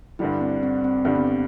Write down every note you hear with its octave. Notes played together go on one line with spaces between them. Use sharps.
G2 D3 G3 E4
C4
C4
C4
G2 D3 G3 C4
B3
C4